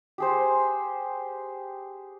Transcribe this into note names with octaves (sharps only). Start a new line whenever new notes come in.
G4 G#4 C5